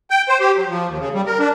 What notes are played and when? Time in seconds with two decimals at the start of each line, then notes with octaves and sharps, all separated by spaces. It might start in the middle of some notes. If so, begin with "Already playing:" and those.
0.10 G5
0.28 C5
0.40 G4
0.56 F#3
0.69 F3
0.88 D#2
1.00 C#3
1.14 G3
1.26 A#4
1.39 D4